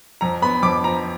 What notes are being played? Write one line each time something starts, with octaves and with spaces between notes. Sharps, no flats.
F2 A#5
B3 B5
F2 D6
F3 A#5